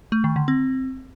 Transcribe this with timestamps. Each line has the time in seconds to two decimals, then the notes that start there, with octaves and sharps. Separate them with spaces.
0.12 A3
0.24 D#3
0.36 D3
0.48 C4